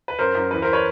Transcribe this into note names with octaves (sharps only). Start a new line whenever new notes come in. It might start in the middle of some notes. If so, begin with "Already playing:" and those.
B4
F#2 A#4 C5
F#2
E3 B4
A#4 C5
B4 C#5